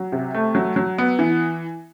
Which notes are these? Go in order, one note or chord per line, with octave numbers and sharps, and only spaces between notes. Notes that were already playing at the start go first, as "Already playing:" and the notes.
Already playing: F#3
C3
A3
F#3
F#3
B3
E3